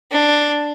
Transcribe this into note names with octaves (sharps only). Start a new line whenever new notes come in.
D4